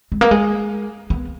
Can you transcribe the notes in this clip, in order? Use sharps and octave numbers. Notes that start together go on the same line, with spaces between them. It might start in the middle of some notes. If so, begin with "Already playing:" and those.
G#3
A#3
G#3
B3